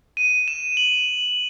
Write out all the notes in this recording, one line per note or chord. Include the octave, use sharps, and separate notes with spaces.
D#7
E7
F#7